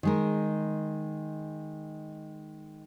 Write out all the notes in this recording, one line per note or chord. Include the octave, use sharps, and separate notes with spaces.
D#3 G#3 A#4